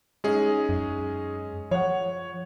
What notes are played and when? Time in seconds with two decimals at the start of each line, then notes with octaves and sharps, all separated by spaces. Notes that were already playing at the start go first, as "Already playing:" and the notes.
0.24 G#3 C#4 D#4 G#4
0.69 F#2
1.71 F3 C#5 F#5